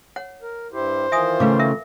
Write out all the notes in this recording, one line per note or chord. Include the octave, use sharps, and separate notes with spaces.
C#5 F#5
A#4
G2 E4 G4 C5
D#3 E3 F4 E5 G#5 D#6
C#3 A3 B4 F5 D6
A#4 E5